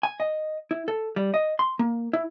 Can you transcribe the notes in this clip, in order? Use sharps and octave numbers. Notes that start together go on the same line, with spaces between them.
G#5
D#5
E4
A4
G3
D#5
C6
A#3
E4